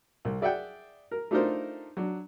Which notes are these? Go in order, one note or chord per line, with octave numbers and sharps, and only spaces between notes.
C2
G#4 D5 E5 F#5 G5
A#4
A3 D4 D#4 F4 A#4 C5
F#3 D4